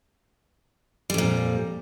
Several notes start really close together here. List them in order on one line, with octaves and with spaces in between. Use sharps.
G3 F2 A#2